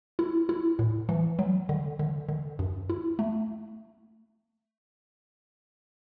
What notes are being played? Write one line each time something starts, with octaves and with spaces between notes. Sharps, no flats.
E4
E4
A2
E3
F#3
D3
D3
D3
F#2
E4
A3